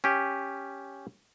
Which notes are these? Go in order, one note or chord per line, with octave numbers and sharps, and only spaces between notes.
C#4 G4